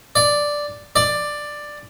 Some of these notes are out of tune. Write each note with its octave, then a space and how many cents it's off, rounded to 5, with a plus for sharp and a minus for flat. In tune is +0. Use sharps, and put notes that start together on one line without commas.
D5 +0
D5 +10